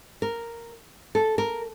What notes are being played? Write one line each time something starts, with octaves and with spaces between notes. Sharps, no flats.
A#4
A4
A#4